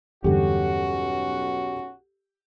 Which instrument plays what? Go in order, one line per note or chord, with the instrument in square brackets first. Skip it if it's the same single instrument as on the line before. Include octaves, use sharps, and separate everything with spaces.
[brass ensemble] B1 C#4 F#4 [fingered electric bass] E2 G2 D3 [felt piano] G4 A4